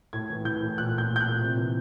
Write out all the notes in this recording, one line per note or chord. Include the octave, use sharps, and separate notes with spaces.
A2 G#6
E3
E3 G6
A2
A#2 F#6
A#2 G6
A#2
G6
A#2 F#6
C3
E3